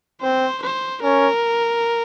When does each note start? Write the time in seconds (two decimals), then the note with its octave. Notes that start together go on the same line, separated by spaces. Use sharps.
0.22 C4 C5
0.62 C5
1.03 C#4 A#4